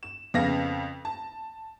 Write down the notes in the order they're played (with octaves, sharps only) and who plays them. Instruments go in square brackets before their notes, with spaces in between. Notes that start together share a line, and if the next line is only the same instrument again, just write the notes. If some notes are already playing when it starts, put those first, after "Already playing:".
[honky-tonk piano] E7
F2 C#3 B3 F5 A#6
A5